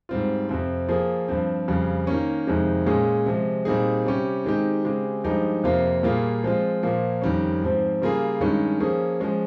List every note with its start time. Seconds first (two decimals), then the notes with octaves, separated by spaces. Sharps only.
0.09 G#2 G3 C4 F4
0.49 F2 C3 F3 C4
0.88 F3 A#3 F4 G#4
1.28 G2 F3 C4
1.68 F2 C#3 G3
2.07 D#3 A#3 C#4
2.47 F2 C3 D#3 G#3 C4
2.86 A#2 G#3 C#4 G#4
3.26 C3 F3 G#3
3.65 A#2 G3 C4 D#4 G#4
4.06 C3 G3 C#4 G4
4.45 D#3 G#3 C4 D#4 G4
4.84 C#3 G#3 C4 G4
5.24 G2 F3 G#3 D#4 G4
5.64 F2 C3 F3 A#3 F4
6.03 A#2 G3 A#3 F4 G#4
6.43 F3 G#3 C4 F4
6.83 A#2 F3 A#3
7.22 F2 D#3 G3 C#4
7.62 G#2 F3 C4
8.02 C#3 G3 A#3 F4 G#4
8.40 G2 D#3 G#3 C#4
8.80 F3 A#3 C#4 G#4
9.20 F3 G#3 C#4